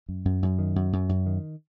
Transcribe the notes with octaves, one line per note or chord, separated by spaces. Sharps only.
F#2
F#2
F#2
D#3
F#2
F#2
F#2
D#3